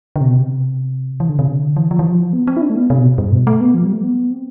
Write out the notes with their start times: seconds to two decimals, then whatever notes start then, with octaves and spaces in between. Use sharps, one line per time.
0.16 D3
0.21 C3
0.26 B2
0.35 C3
1.20 E3
1.29 D3
1.39 C3
1.48 D3
1.77 E3
1.91 F3
1.99 E3
2.07 F3
2.33 B3
2.47 C4
2.57 E4
2.62 D4
2.70 A3
2.76 B3
2.90 C3
2.99 B2
3.18 G2
3.32 B2
3.47 A3
3.61 B3
3.75 F3
3.85 G3
3.93 A3
4.03 B3
4.31 C4